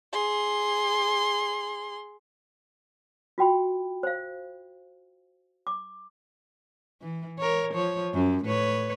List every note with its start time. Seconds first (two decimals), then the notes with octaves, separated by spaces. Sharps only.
0.13 G#4 C6
3.38 F4 F#4 G5 B5
4.03 C5 F5
5.67 D6
7.02 E3
7.39 A#4 C#5
7.74 F3 C#5
8.14 F#2
8.45 A2 B4 C#5